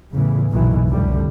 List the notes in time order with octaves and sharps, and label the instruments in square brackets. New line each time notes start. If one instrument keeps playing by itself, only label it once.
[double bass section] E2 A2 C#3 E3
F#1 B1 A#2 D#3 E3
F1 C2 A2 D3 G3